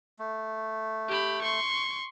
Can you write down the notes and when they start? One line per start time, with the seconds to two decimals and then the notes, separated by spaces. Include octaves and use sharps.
0.19 A3
1.09 G4 B5
1.42 C6 C#6